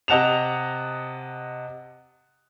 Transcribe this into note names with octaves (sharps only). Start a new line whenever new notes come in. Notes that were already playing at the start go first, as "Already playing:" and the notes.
C3 D#5 F#5 A5 E7 F7